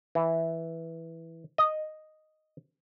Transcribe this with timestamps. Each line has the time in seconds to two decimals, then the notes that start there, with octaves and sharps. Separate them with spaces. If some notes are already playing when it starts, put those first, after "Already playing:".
0.15 E3
1.58 D#5